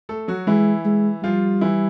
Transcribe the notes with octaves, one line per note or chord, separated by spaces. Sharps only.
A3 A4
F#3 F#4
E3 G#3 E4
G#3
F3 G3 F4
E3 E4